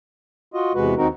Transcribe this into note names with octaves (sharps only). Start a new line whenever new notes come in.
F4 F#4 D#5
E2 C3 G#3 F#4 B4
D#2 D#3 C4 D#4 F#4 A#4